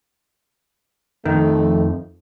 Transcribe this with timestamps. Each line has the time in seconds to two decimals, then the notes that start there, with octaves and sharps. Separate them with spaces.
1.25 F2 D#3 A3